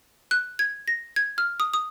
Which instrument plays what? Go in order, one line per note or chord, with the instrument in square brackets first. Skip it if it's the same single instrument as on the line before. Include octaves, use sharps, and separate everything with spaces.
[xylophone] F#6
G#6
A#6
G#6
F6
D#6
D#6